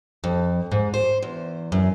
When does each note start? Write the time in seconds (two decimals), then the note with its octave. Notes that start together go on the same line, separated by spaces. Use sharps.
0.24 F2
0.72 G#2
0.94 C5
1.23 E2
1.72 F#2